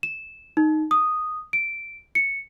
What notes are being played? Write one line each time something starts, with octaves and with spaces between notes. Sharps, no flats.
E7
D#4
D#6
D7
C#7